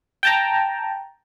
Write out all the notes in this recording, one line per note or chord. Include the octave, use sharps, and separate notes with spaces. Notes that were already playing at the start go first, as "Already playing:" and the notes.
G5 A5 A#5